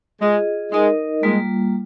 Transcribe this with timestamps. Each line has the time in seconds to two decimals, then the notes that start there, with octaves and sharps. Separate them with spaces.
0.22 G#3 F4 G#4 D#5
0.72 G#3 D#4 A#4 D#5
1.23 G3 G#3 A#3 F4